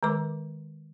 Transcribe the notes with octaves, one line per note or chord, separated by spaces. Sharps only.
D#3 G#3 A#4 D6